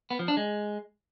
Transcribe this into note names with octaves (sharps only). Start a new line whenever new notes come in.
B3
F3
D4
G#3